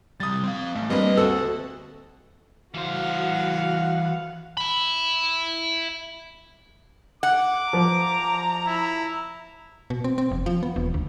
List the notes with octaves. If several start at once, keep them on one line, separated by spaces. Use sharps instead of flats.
C3 G3 D#6 A6
C4 F5
A1 A3
G3 A#3 C4 D4 B4 D#5
D2 C4 F#4 A4 E6
E3 F#4 C5 F5 F#5
E5 B5
F#5 D6
F3 A#5
E4
B2
C4
C4
F1
F3
B3
E1
D2